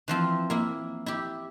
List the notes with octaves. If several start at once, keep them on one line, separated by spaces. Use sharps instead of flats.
E3 F3 C4
A#3 E4
E4 G4